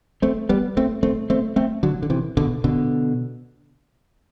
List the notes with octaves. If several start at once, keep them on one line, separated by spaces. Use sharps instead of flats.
A3 C4
G3 B3
A3 C4
A3 C4
A3 C4
A3 C4
D3 F#3
D3
C3 E3
B2 D3
B2 D3